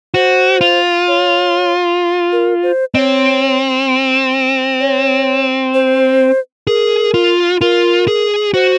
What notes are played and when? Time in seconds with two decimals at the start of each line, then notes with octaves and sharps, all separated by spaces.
0.14 F#4 C5
0.61 F4
1.08 C#5
2.32 A#4
2.63 C5
2.94 C4 C#5 D#5
4.80 C#5
5.74 C5
6.67 G#4 A#4
7.14 F4
7.61 F4 A#4
8.08 G#4
8.54 F#4 C5